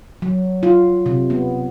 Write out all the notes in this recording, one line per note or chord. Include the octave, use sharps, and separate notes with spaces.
F#3
F4
C3
B3